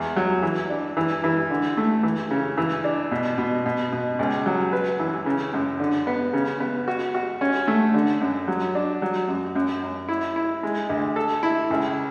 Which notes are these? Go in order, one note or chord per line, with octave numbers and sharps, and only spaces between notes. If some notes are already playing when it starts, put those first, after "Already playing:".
Already playing: E2 G#3
F#3
E3
D4
E3
E3
D3
A3
E3
C#3
E3
D4
B2
B2
B2
B2
C#2
F#3
B4
E3
C#3
F#2
D3
B3
C#3
B3
F#4
F#4
C#4
A3
D3
F#2
F#3
D4
F#3
F#2
F#2
F#2
E4
E4
G#3
D2
A4
E4
C#2